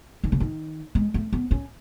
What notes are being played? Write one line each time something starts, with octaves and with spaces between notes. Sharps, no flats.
D#3
C#3
D#3
G#3
A3
B3
C#4